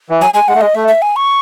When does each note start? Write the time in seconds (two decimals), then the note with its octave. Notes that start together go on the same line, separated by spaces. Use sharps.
0.10 E3
0.21 F#3 G#5
0.34 G#3 G#5
0.48 G#3 F#5
0.55 A3
0.61 G#3 D#5
0.75 A3 E5
0.88 E5
1.02 G#5
1.16 C#6